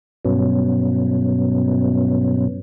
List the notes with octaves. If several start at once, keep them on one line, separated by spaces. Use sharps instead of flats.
G2 B2 F#3 B3 C#4